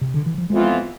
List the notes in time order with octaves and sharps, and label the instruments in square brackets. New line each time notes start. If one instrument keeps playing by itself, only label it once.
[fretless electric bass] C3
D3
E3
F3
[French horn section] F2 E3 B3 F4 [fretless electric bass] G#3